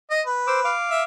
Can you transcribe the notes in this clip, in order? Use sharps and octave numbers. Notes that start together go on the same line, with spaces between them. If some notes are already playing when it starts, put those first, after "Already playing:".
D#5
B4
C5 D6 E6
F5 D6
E5